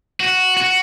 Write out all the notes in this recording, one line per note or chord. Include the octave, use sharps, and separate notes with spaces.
F#4
F#4